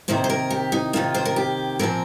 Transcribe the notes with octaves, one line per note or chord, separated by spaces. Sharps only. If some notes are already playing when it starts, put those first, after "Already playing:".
C3 D#3 A#3 C5
C5
A#4
G4
D#4
C3 D#3 A#3 F4
C5
A#4
G4
A#2 F3 C4 A#4